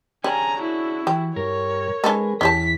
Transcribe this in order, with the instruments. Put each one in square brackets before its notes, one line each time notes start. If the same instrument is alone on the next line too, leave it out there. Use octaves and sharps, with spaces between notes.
[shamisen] G3 [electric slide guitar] C#4 D4 G#4 [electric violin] G#5 A#5
[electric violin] E4 F#4
[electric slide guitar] E3 [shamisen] G4
[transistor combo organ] G2 [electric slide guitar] A#4 [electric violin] C#5
[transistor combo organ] G#3 G#4 B4 [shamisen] C#4 D#4 A4
[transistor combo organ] E2 [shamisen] C#4 G4 A5 [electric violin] B6